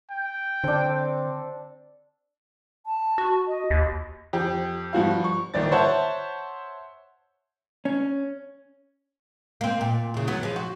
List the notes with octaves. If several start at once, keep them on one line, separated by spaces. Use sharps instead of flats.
G5
D3 C4 D4 A4
A5
F#4
D#5
D#2
F2 G4
G2 F3 F#4 F5
C#6
G1 A#2 D#3 D5 A6
C5 C#5 E5 F#5 A5
C#4
A#3 C4
A#2
E2 C#3
F#3 B3
F3 G#4
F#4